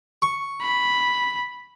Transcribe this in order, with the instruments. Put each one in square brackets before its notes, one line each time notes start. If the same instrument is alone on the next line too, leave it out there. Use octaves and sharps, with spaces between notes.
[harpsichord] C#6
[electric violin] B5